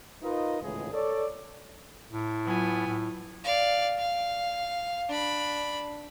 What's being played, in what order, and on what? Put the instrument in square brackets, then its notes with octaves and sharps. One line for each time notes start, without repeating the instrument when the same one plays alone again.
[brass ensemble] D#4 F4 A#4 B4 D#5
G#1 C#2 A2 E3 G#4
A4 C#5 D5
[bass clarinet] A2
[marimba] F#3 F4 [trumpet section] B3 G#5
[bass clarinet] A2
[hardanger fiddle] D5 F5
F5
D4 B5